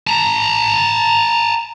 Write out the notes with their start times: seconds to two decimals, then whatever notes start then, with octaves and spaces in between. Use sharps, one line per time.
0.07 A5 A#5